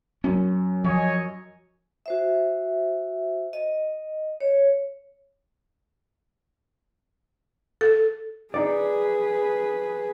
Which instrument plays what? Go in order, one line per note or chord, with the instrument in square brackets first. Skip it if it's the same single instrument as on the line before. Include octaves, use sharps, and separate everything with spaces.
[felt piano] F#2 [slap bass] C#4
[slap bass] F3 [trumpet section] C#5 D#5 G#5
[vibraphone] F#4 C5 E5
D#5
C#5
[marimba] A4
[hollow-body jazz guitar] D#4 D5 [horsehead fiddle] G#4 B4